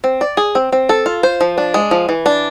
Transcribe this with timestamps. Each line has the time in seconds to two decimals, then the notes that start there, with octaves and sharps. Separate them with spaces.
0.04 C4
0.21 D5
0.37 G#4
0.55 C4
0.72 C4
0.89 A4
1.06 F4
1.23 C5
1.41 F3
1.58 D4
1.74 G#3
1.91 F3
2.09 E3
2.26 D4